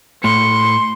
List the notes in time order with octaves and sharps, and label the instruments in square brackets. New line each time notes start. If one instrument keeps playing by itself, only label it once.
[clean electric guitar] A2 [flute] C6 [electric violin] C#7